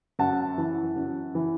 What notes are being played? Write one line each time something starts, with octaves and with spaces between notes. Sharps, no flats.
F#2 F#5 A5
E3
F#2
E3